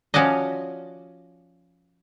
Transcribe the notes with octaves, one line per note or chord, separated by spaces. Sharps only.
F3 C#4 F#4 D5 D#5